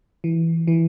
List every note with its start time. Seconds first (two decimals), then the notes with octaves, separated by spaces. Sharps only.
0.24 E3
0.67 E3